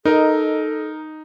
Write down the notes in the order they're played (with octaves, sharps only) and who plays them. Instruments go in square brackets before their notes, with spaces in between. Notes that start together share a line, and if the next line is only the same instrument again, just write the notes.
[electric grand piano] D#4 [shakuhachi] A4 [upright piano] A#4 D#5